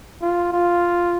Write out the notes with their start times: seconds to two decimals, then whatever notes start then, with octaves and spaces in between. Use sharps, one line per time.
0.21 F4
0.52 F4